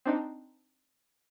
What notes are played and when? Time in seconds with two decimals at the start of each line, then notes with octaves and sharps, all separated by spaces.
0.05 C4 D4 D#4